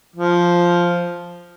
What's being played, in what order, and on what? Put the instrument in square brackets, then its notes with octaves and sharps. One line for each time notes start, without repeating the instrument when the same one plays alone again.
[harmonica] F3